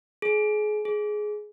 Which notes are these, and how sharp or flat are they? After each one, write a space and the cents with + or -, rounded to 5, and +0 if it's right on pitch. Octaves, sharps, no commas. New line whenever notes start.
G#4 +30
G#4 +15